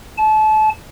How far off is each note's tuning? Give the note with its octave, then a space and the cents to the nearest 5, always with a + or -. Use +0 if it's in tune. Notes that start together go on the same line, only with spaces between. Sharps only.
A5 -30